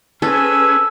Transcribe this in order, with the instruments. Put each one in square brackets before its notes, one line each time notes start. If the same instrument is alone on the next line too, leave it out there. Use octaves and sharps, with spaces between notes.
[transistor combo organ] C#4 G#4 B4 [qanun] A4 [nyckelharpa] C5 G#5 [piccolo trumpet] E6